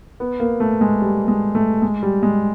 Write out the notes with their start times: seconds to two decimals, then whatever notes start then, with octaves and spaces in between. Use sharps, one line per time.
0.20 B3
0.40 A#3
0.60 A3
0.81 G#3
1.01 G3
1.28 G#3
1.55 A3
1.82 G#3
2.03 G3
2.23 G#3